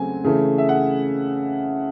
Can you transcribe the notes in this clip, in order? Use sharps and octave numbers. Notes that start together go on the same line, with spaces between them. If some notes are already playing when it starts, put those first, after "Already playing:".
Already playing: C#3 F#3 A3 C4 G#5
C#3 E3 A3
E5
F#5